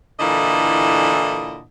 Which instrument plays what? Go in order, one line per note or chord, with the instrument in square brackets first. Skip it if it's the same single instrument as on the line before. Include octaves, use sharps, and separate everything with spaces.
[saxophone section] A#2 D3 E3 E4 A4 D#5